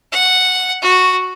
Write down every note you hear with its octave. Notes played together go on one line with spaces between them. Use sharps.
F#5
F#4